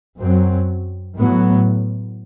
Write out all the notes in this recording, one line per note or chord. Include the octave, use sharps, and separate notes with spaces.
F#2 F#3 C4
A2 F#3 B3